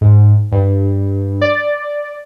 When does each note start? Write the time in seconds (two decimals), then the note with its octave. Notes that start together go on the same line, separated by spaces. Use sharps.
0.01 G#2
0.52 G2
1.41 D5